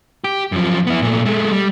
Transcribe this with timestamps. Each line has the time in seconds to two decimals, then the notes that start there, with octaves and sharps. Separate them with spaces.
0.24 G4
0.52 F#2 F3
0.87 B3 E4
1.02 A#2 A3
1.26 G#3 A3
1.52 G3